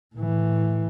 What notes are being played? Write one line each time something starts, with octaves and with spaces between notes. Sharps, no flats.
A2 E3